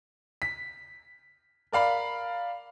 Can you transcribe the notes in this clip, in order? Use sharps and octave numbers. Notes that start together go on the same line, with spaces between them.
B6
A#4 D5 F5 B5